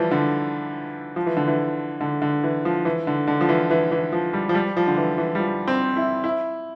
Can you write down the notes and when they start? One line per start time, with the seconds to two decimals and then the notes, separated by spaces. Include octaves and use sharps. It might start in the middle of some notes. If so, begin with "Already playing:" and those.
Already playing: E3 F3 G3
0.11 D3
1.16 F3
1.26 E3
1.37 D3
1.48 E3
2.01 D3
2.22 D3
2.44 E3
2.65 F3
2.85 E3
3.07 D3
3.28 D3
3.41 F3
3.49 E3
3.71 E3
3.91 E3
4.12 F3
4.33 G3
4.49 F3
4.55 G3
4.77 F3
4.87 D3
4.97 E3
5.18 E3
5.35 G3
5.40 F3
5.68 C4
5.97 E4
6.24 E4